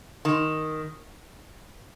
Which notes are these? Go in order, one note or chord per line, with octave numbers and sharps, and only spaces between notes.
D#3